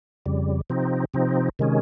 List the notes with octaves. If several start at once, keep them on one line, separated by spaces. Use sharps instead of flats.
F2 C#3 G3
C3 F3 C4 D#4
C3 F3 C4 D#4
C3 D#3 G#3 C#4